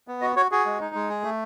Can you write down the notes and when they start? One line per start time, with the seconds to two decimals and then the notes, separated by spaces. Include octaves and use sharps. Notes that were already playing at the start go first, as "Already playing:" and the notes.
0.08 B3
0.21 F#4 D#5
0.36 F#4 C#5
0.51 F#4 G#4
0.66 G#3
0.81 D#4
0.95 G#3
1.09 G#4
1.24 A3